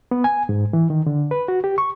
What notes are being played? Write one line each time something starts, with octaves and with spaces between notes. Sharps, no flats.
B3
G#5
G#2
E3
D#3
D3
B4
F#4
G4
C#6